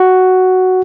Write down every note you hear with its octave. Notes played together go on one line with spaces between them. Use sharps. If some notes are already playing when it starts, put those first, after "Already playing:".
Already playing: F#4